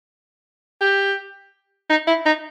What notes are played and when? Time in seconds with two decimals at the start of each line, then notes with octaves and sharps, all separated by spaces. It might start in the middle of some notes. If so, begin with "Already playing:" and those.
0.81 G4
1.90 D#4
2.07 E4
2.26 D#4